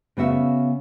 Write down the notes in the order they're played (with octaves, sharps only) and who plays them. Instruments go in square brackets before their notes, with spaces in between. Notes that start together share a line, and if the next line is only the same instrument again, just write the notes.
[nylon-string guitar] C#3 B3 F#4 E5 F5